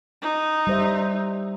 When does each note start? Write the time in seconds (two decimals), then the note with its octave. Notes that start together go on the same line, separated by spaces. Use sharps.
0.22 D#4
0.67 G3 C5 E5